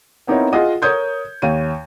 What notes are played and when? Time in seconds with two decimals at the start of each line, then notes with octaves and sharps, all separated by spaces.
0.27 B3 C4 D#4 E4 A#4 C#5
0.52 F4 G#4 D#5 F#5
0.82 A#4 C#5 D#6 G6 G#6
1.42 D#2 C#5 D#7